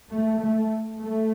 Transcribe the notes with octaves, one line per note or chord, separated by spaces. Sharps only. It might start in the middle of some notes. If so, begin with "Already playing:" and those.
A3
A3
A3